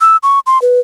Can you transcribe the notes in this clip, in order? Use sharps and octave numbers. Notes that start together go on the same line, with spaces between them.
E6
C#6
C6
B4